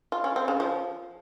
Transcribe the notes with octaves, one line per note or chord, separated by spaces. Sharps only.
F4
C#4
C4
C#3
F3